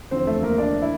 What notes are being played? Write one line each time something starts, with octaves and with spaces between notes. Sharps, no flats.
E2 D3 F3 C4 C5
A3 A4
A#3 A#4
D4 D5
E4